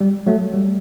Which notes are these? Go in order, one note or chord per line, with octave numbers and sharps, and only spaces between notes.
G3
F#3 A3
G3